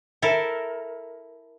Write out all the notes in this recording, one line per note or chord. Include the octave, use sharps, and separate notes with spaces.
E4 A4 A#4